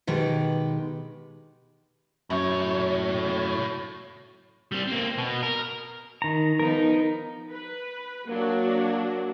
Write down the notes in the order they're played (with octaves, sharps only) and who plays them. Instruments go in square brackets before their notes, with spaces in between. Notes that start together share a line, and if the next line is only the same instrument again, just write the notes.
[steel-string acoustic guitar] B2 D#3 G#3 G4 B4
[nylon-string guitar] F#2 [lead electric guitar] A2 C#5
[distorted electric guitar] G3 C4
A#3 C4
B2
A#4
[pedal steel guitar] D#3 A#5
[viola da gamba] F3 B3 D#4 [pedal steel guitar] A#4 A#5
[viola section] B4
[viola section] F#3 D4 F#4 [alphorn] A#3